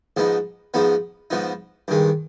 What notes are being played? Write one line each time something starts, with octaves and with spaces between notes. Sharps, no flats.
G#2 F3 B3 D#4
G#2 F3 B3 D#4
G#2 F3 B3 D#4
G2 D#3 G#3